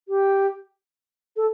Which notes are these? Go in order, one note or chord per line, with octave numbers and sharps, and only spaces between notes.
G4
A4